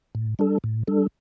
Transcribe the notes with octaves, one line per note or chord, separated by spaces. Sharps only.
A2
G3 D4 A4
A2
G3 D4 A4